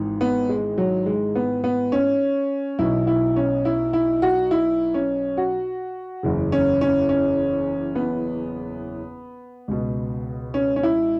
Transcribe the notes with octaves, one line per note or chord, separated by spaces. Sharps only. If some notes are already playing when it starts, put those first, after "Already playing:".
Already playing: G#1 G#2 E3
B3
G#3
F#3
G#3
B3
B3
C#4
B1 B2 E4
E4
C#4
E4
E4
F#4
E4
C#4
F#4
F#1 E2 C#3
C#4
C#4
C#4
B3
C#2 B2
C#4
C#4
E4